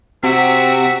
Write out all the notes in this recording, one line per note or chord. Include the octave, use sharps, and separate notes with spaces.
C3 C4 F#4 E5 F#5